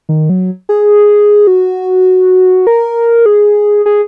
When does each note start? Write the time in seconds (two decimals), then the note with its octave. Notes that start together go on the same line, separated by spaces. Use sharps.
0.09 D#3
0.29 F#3
0.69 G#4
1.47 F#4
2.67 A#4
3.26 G#4
3.86 G#4